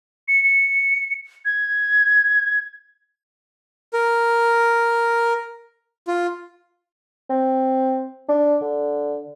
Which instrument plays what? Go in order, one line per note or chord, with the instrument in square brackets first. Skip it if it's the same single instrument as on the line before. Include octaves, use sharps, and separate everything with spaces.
[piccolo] C#7
C#7
G#6
[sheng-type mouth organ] A#4
F4
[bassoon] C4
D4
D3